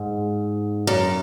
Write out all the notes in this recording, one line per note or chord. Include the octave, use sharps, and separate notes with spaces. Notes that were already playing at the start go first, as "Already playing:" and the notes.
Already playing: G#2
F#2